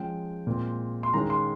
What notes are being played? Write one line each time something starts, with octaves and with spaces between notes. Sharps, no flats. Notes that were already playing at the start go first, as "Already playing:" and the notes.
Already playing: F3 G#3 C#4 G5
A#2 G#3 C4
C6
D#3 G#3 C#4 A#5
C6